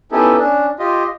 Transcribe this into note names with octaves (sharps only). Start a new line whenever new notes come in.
B3 C#4 D#4 E4 G4 A4
C#4 D4
F4 G4 D#5